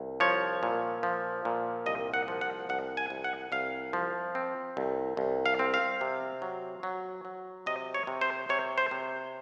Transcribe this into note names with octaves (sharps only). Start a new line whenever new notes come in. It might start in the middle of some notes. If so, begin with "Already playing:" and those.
Already playing: C2
F3 C#5
A#2
F3
A#2
C2 D#5
F#5
F3
F#5
C2 F#5
G#5
C2
F#5
C2 F5
F3
C4
C2
C2
F5
C4
F5
C3
F#3
F#3
F#3
C3 D#5
C#5
C3
C5
C3 C#5
C5
C3